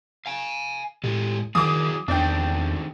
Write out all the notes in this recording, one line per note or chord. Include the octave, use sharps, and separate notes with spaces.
F5 G#5
A2 G#3 G4 A4
D#3 F#3 E4 G#4 D6 D#6
E2 D#3 A3 C4 D4 G5